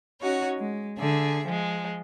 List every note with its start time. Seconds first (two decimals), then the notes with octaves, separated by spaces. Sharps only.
0.21 C#4 D#4 F#4 C#5 F#5
0.59 G#3
0.99 D3 G#4 E5
1.46 F3 G#3